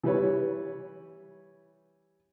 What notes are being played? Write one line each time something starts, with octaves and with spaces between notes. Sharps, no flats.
E3 G3 B4 C#5